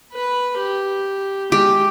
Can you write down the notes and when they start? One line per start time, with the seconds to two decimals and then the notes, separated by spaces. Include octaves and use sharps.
0.13 B4 B5
0.57 G4
1.52 G#3 G4